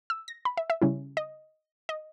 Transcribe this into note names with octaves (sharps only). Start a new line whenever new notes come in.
E6
A#6
B5
E5
E5
C#3 G3 C#4 E4
D#5
D#5